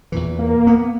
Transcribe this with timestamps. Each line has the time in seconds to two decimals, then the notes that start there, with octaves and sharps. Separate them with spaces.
0.12 E2 A#2 E3
0.39 A#3
0.67 B3